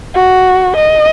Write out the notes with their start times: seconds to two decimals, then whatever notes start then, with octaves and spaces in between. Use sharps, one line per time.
0.15 F#4
0.76 D#5